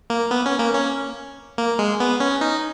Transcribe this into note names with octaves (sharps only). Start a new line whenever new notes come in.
A#3
B3
C#4
A#3
C#4
A#3
G#3
B3
C#4
D#4